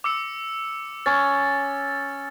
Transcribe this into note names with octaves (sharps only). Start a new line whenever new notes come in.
D6 E6 C#7
C#4 A6